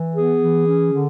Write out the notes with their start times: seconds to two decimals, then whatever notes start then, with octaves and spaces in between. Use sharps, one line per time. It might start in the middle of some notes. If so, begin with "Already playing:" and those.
Already playing: E3
0.15 B3 G#4
0.41 E3
0.67 C#4
0.92 D3